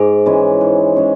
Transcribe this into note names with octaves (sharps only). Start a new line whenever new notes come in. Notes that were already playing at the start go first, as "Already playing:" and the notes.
Already playing: G#2 G#4
E3 G#3 C#4
G#2
G#3 C#4